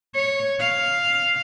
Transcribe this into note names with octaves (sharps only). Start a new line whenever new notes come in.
C#5
F5